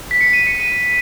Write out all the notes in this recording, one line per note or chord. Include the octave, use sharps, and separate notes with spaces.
B6
C#7
D#7
C#7
D#7